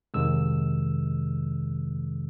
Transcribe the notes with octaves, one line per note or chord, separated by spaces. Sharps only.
F2 C3 D#3 G#3 E6